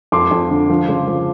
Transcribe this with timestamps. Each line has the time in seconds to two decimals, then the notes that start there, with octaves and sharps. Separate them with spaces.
0.12 F2 C6 D6
0.31 F2
0.50 D3
0.70 F3
0.88 C#3
1.07 F3